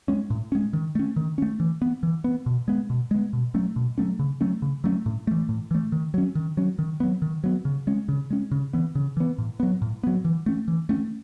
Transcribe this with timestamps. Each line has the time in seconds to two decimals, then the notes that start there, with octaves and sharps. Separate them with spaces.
0.08 G#3 C#4
0.30 A2
0.52 G#3 C#4
0.73 D#3
0.95 A3 C#4
1.16 D#3
1.38 A3 C#4
1.60 E3
1.82 B3
2.03 E3
2.24 B3
2.46 B2
2.68 G#3 B3
2.90 B2
3.11 G#3 B3
3.33 B2
3.54 F#3 A3 C#4
3.76 B2
3.98 F#3 A3 C#4
4.19 C#3
4.41 F#3 A3 C#4
4.62 C#3
4.84 F#3 A3 C#4
5.06 A2
5.27 E3 A3
5.49 A2
5.71 E3 A3
5.92 D#3
6.14 F#3 C#4
6.35 D#3
6.57 F#3 C#4
6.79 D#3
7.00 F#3 B3
7.22 D#3
7.44 F#3 B3
7.65 C#3
7.87 G#3 C#4
8.09 C#3
8.30 G#3 C#4
8.52 C#3
8.73 E3 B3
8.95 C#3
9.17 E3 B3
9.38 A2
9.60 F#3 B3
9.82 A2
10.03 F#3 B3
10.25 E3
10.46 A3 C#4
10.68 E3
10.89 A3 C#4